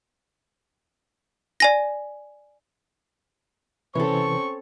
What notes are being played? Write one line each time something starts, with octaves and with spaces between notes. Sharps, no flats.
D5 G#5 A#6
C3 E3 C4 C#4 A4 B4 C#5 C#6